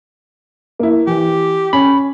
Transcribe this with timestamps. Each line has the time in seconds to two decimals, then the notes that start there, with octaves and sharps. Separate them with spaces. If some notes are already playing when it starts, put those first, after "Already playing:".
0.79 A#3 E4
1.07 E3 G4
1.73 C#4 B5